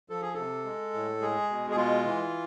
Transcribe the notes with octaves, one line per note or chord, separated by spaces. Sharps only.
F3 A4
G#4
C3 A4
G#3
A2
G#3 G#4
B2
G#4
G#3 F4
E3